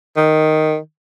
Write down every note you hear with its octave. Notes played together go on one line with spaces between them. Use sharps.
D#3